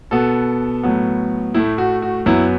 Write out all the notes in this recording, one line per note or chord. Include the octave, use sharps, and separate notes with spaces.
B2 B3 A4
A2 F#3 B3
A2 A3 E4
F#4
F#4
F#2 F#3 B3 E4